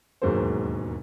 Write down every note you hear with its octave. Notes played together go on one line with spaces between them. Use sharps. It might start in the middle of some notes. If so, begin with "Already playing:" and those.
E1 D#2 G#2 F#3 A#3 C5